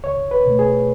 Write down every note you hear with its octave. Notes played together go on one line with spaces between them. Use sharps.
C#2 C#5
B4
B2 A3
G#4